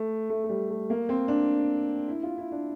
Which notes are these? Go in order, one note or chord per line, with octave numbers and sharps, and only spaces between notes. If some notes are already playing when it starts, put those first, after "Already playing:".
Already playing: A3
A3
A3
G3
A3
A#3
C4
D4
E4
F4
E4
D4